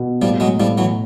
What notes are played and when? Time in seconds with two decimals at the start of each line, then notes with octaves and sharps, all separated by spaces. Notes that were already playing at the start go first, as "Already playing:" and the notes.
Already playing: B2
0.21 A2 F3 G3
0.40 F#3 G#3
0.59 A2 F3 G3
0.78 E3 F#3